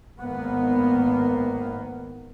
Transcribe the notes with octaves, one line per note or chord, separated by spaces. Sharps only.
G#1 D#3 A#3 B3